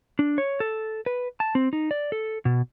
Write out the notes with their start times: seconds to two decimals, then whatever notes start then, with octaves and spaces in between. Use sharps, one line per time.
0.19 D4
0.38 C#5
0.60 A4
1.06 B4
1.40 A5
1.55 C4
1.73 D#4
1.91 D5
2.12 A4
2.45 B2